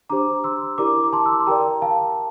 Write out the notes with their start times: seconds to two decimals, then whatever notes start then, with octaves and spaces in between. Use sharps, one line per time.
0.09 D4 G4 C5 A#5 D6
0.44 C6 E6
0.78 E4 G4 A#4 D5 A#5 D6
1.04 D6
1.13 A5 C6
1.26 E6
1.32 D6
1.40 C6
1.46 G4 A#4 D5 G5 A#5
1.82 F5 A5